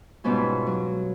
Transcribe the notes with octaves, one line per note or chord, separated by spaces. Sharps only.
G#2 B2 G3 B3 C#4 F4
F#3